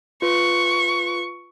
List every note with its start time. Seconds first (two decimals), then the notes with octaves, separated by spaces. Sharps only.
0.22 F4 B4 C#6